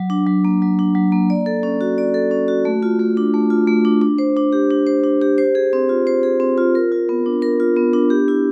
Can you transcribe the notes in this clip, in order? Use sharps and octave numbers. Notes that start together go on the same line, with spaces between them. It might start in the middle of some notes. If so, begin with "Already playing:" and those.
Already playing: F#3
D4
F#3
A#3
F#3
D4
F#3
A#3
D5
A4
C#4
F#4
D5
A4
C#4
F#4
A3
F4
A3
D4
A3
F4
A3
D4
D4
C5
D4
G4
D4
C5
D4
G4
C5
G#4
C4
F4
C5
G#4
C4
F4
A#4
F4
B3
D4
A#4
F4
B3
D4
G4
E4